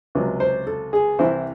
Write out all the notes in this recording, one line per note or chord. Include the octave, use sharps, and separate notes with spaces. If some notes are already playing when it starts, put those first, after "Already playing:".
C#2 C3 F#3
C5
A4
G#4
C2 C3 E3 C5